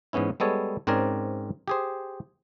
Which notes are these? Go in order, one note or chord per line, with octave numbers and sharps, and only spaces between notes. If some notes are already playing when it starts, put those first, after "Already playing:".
G#2 E3 B3 C#4 E4
G3 G#3 B3 A4 C#5
G#2 C4 C#4 A#4 D5 G#5
G4 G#4 C5